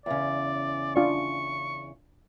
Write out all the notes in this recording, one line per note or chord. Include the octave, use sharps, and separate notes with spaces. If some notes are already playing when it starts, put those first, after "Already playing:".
E2 C#3 D5
D4 F4 D5 C#6